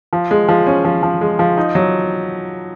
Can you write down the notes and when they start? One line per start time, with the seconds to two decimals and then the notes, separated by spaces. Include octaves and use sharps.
0.13 F3
0.31 G#3
0.48 F3
0.67 C#4
0.85 F3
1.03 F3
1.21 G#3
1.39 F3
1.57 D#4
1.75 F#3